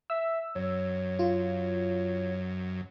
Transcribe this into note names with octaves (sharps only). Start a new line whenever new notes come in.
E5 E6
F#2 C#5
F4